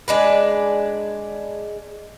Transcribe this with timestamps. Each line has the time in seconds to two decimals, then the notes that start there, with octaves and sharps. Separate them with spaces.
0.08 G#3 D4 B4